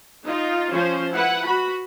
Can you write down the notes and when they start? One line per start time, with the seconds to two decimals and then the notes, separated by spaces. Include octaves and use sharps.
0.25 D#4 F4
0.72 F3 C#4 C5
1.14 E4 B4 F#5
1.45 F#4 B5